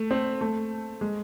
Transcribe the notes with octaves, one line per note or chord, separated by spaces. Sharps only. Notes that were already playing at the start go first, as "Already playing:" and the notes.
Already playing: A3
C4
A3
G#3